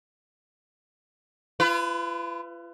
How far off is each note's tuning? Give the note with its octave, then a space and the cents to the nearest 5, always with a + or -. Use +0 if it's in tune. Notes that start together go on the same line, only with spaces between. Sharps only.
F4 -40 B4 +20